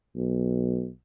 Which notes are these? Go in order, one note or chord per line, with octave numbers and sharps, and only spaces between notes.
B1